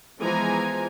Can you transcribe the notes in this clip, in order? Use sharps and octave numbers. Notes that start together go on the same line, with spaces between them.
E3 F3 G#3 B3 G#5 A#5